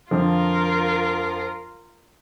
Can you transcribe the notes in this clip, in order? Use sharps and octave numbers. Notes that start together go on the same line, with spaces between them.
F2 D3 F3 F4 A#4